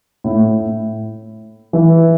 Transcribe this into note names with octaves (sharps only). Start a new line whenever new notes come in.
A2
E3